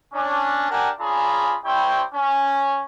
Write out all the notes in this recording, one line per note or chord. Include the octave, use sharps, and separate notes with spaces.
C#4 D4
D4 G4 A#4 F#5 G#5 A5
C#4 D4 F4 G#4 A#5 B5
G3 C4 E4 C5 C#5 G5
C#4